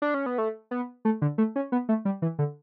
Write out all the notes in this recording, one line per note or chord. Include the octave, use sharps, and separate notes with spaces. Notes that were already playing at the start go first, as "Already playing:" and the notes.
D4
C#4
B3
A3
B3
A3
D3
A3
C#4
B3
A3
G3
E3
D3